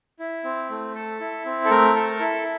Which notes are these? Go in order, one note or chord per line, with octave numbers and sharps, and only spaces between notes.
E4
C4
A3
A4
E4
C4
A4
A3 A#4
A4
E4